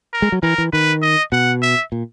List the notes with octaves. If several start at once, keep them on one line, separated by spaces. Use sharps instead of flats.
A#4
G#3
F#3
E3 A#4
E3
D#3 B4
D#5
B2 F#5
E5
A#2